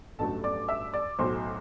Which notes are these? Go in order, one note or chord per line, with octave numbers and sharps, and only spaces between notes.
A1 G2 F#3 A3 A4 A5
D5 D6
E5 E6
D5 D6
B1 A2 F#3 C5 C6